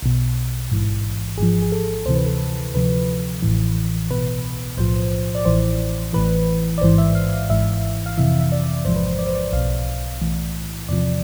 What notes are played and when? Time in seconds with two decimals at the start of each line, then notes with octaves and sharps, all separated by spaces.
0.02 B1 B2
0.71 A1 G#2 E3
1.38 G#1 G#2 F3 G#4
1.62 G#4
1.72 A4
2.06 D2 C3 E3 C5
2.16 B4
2.26 A4
2.37 B4
2.74 D2 C3 F3 B4
3.42 A1 A2 E3
4.10 C2 B2 B4
4.77 B1 A2 F3 C5
5.35 D5
5.45 A1 A2 E3 C5
6.13 A1 A2 E3 B4
6.78 D5
6.81 A1 G#2 E3 C5
6.98 E5
7.15 F5
7.33 F5
7.49 G#1 G#2 E3 E5
8.06 F5
8.18 F2 C3 E3 E5
8.40 E5
8.52 D5
8.85 A1 G#2 F3 C5
8.96 B4
9.07 C5
9.19 D5
9.27 C5
9.35 D5
9.53 B1 B2 F5
10.21 B1 A2 E3
10.89 E2 C3 F3 D5